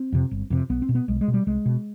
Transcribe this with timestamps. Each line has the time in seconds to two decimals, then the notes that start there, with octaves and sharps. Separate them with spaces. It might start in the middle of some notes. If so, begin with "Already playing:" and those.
Already playing: C4
0.12 F2 C3
0.31 G1
0.50 F2 C3
0.69 B1 B3
0.82 C4
0.89 B2
0.95 B3
1.08 B1 G#3
1.21 G#3
1.28 B2
1.34 G3
1.47 C2 G#3
1.66 B2